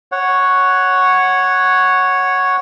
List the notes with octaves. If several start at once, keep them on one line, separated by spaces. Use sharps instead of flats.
C#5 F#5